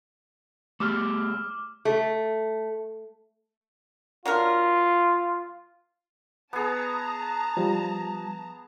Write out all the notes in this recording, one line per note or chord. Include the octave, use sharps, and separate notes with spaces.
A3 G4 G#4 D6 E6 F6
A3
F#3 D4 F4 A#4
B3 G#4 A5 A#5
F3 G3